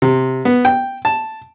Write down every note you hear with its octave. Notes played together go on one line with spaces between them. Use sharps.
C3
B3
G5
A5